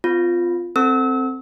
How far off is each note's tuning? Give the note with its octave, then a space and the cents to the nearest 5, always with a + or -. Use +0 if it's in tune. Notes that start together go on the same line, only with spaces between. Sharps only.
C4 -40 F4 +0
C4 +0 A4 +20 E6 -35